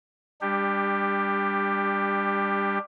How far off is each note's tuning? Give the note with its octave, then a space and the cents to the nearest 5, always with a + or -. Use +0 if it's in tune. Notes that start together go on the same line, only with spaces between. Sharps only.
G3 +30 D4 +0 G4 +10